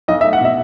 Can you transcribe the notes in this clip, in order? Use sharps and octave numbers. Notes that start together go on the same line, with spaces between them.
B1 D#5
E5
A3
F#5
B2 E5